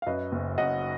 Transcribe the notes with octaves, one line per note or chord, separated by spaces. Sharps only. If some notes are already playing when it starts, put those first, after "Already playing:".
F5
F#2 B4 D#5
F#1
F#2 D#5 F#5